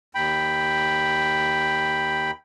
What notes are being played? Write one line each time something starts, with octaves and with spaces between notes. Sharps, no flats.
D#2 G5 B5